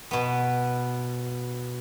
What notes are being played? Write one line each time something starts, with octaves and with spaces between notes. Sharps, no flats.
B2 B3